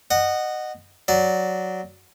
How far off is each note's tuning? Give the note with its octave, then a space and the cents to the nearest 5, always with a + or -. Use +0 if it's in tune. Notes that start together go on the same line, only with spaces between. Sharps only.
D#5 -20 F#5 +0
F#3 +0 D5 +0